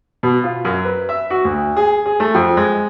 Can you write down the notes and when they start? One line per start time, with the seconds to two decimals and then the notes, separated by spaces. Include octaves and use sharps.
0.23 B2
0.44 F4
0.65 F#2
0.85 B4
1.09 E5
1.30 F#4
1.45 D2
1.77 G#4
2.06 G#4
2.20 A3
2.34 F2
2.57 G#3